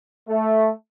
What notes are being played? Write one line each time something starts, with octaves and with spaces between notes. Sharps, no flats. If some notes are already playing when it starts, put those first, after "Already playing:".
A3